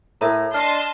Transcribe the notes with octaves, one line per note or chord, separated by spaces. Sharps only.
A2 A#4 E5 A#5
D4 D#5 A5 C6 F6